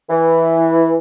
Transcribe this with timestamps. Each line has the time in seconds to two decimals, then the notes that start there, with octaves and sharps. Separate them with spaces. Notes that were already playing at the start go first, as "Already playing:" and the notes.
0.10 E3